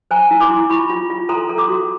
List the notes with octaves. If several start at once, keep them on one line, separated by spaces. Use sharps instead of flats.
C5 G#5 A#5
E4
C6 D6
E4
F4 B5 C#6
F4
F4
A4 A#5 C6
A4
C6 D6
F#4